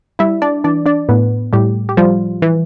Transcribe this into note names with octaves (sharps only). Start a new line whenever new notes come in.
G3 E4 E5
D4 D5
E3 D4 D5
D4 D5
A2 B3 B4
A2 G3 G4
G4
F3 G3 F4
E3